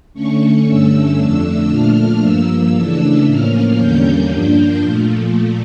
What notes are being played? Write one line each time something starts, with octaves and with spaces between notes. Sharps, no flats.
D3 A3 C#4 C#6
G2 D3 A3 C#4 E6
F2 D3 A3 D4
A#2 F3 A3 D4 F6
G2 F3 A#3 E6
C#3 E3 A3 D4
A2 F3 A#3 C#4 F6
E2 D3 G3 A#3 C#4 G6
G2 F3 A#3 D4
A#2 F3 A3